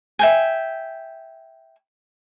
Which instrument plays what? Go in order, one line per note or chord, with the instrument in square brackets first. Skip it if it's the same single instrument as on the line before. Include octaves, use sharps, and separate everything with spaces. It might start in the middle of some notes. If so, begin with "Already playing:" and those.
[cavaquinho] E5 G5 G#5